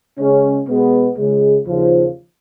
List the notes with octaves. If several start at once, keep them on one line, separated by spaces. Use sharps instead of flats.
C#3 G#3 C#4
B2 G#3 B3
C#2 C#3 G#3
D#2 C#3 F3